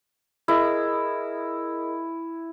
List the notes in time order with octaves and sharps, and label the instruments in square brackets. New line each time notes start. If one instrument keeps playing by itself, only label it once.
[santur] E4 [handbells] G#4 A#4 D#5